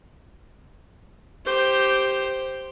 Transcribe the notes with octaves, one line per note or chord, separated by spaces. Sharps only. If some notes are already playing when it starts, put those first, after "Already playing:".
G4 C5